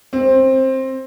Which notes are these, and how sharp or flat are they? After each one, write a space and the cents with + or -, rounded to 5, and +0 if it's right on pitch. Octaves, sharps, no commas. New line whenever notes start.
C4 +15